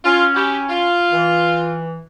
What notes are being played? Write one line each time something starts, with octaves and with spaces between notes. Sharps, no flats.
C#4 F4
E4 F#4 G4
F4
E3